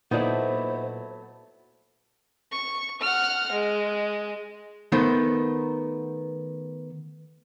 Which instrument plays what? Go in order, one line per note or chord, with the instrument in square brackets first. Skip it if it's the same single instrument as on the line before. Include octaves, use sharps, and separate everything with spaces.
[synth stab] A#2 [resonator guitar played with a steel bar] F#3 A3 B3 [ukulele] D#4 E4 D5 [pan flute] C5
[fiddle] C#6
F#5 F6
G#3
[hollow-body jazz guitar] D#3 A3 B3 C5